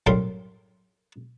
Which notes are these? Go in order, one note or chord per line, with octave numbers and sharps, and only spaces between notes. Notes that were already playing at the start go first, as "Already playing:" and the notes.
F#2 A2 G3 F5 C6